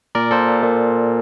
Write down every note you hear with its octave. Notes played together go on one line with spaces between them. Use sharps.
A#2 A#4 D5
A#2 A4 C5
A#2
A#2